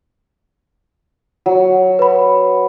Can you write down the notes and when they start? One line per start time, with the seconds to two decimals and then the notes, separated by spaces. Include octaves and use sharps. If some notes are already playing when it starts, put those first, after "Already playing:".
1.46 F#3
1.99 B4 B5